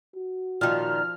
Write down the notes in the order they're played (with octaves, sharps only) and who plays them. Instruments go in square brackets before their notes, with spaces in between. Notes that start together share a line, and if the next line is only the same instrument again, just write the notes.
[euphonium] F#4
[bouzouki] A#2 D#3 [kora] F3 F4 [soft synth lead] F6